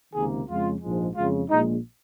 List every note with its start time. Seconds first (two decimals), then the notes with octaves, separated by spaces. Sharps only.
0.14 C#2 C3 D#3 A#3 G#4
0.48 F2 C#3 G#3 F4
0.81 A#1 G#2 F3 G#3
1.15 F2 C#3 G#3 F4
1.48 A#1 A#2 G#3 D#4